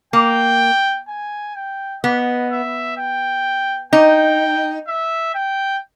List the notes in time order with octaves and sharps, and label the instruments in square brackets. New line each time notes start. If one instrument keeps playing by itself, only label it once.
[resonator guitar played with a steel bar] A#3 [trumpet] G5
[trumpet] G#5
G5
[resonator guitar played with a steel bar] B3 [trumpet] D#5
[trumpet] E5
G5
[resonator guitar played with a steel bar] D#4 [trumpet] G5
[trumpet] E5
G5